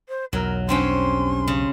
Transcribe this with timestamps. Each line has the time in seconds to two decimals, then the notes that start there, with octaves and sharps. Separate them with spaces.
0.09 C5
0.33 B1 E2 F#3 A#4
0.69 G2 C4 C#4 C6
1.48 C#3